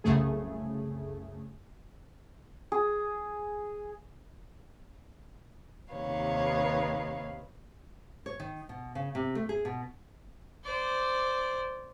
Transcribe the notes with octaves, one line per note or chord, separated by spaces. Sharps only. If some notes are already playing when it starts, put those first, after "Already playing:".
C2 F#2 C#3 A3 G#4
G#4
D#2 C3 D#3 B4 C#5 F5
C#5
D#3
B2
C#3
C3
A3
G#4
B2
C5 D5